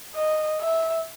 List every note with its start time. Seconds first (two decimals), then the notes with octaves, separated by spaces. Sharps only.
0.16 D#5
0.61 E5